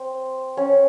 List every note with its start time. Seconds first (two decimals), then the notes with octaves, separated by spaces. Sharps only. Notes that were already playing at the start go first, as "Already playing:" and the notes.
Already playing: C4
0.57 C#4